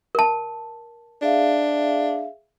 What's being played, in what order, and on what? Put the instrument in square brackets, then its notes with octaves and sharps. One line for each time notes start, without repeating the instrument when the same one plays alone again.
[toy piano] A#4 A5
[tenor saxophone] D4 [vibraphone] G#4 E5 F5